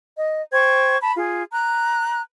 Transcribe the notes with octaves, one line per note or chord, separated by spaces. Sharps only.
D#5
C5 G5 C#6 G#6
A5 B5
F4 G#4
A#5 F#6